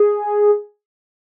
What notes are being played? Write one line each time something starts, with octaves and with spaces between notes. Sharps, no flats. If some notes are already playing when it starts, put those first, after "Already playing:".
Already playing: G#4